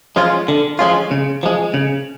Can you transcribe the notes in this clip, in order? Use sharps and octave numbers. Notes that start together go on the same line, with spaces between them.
F3 G#3 C#4 F4
D3
F3 G#3 C#4 F4
C#3
F3 G#3
C#3